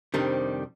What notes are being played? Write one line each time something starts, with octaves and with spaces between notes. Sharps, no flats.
F2 C3 D#3 G3 D4